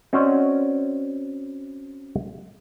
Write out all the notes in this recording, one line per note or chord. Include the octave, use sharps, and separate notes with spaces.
C4 C#4 F#4 C5 D5 D#5